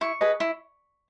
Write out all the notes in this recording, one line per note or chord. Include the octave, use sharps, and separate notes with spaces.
E4 C#6
G#4 B4 D#5
E4